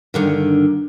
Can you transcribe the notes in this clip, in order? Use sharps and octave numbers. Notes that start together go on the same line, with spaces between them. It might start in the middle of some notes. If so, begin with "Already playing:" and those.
G2 D3 D#3